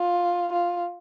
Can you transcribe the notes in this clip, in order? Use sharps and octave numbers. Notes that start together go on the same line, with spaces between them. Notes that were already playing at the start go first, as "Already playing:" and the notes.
Already playing: F4
F4